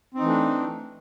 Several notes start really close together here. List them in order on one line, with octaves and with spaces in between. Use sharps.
C4 D#4 E3 A3 D4